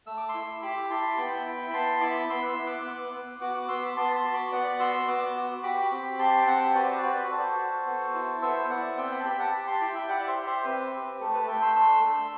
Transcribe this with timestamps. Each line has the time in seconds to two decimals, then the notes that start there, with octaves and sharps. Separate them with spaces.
0.07 A3 E6
0.17 D6
0.29 C6 E6
0.34 E4
0.62 G4 B5 D6
0.90 E4 A5 C6
1.18 B3 G5 B5
1.46 E4
1.70 B5
1.74 B3 A5 C6
2.01 E4 B5 D6
2.30 B3 C6 E6
2.43 F#6
2.48 C6 E6
2.57 B3
2.66 D6 F#6
2.85 B3 D6 F#6
3.13 B3
3.41 F#4 D6 F#6
3.54 D6 F#6
3.68 B3 C6 E6
3.82 B5 D6
3.97 B3 A5 C6
4.15 A5 C6
4.24 F#4
4.34 B5 D6
4.52 B3 D5 F#5
4.80 F#4 C6 E6
5.08 B3 D6 F#6
5.36 F#4
5.63 G4 B5 D6
5.91 C4
6.19 G4 A5 C6
6.42 G5
6.47 C4 F#5 A5
6.65 C5
6.75 F#4 B4 D5
7.02 F#4 B4 D5
7.26 D5
7.31 F#4 A4 C5
7.58 F#4
7.86 B3
8.14 E4
8.42 B3 C5 E5
8.70 B3 D5 F#5
8.97 C4 E5 G5
9.12 G5 B5
9.20 A5
9.25 G4 G5 B5
9.39 F#5 A5
9.53 G4
9.67 A5 C6
9.81 E4 G5 B5
9.95 E5 G5
10.09 G4 D5 F#5
10.27 C5 E5
10.37 G4
10.46 C5 E5
10.64 C4 B4
10.93 G4
11.20 A3 A4
11.34 B4
11.44 A5
11.48 A3 E5 G5
11.62 C6 E6
11.76 D4 C6 E6
12.03 A3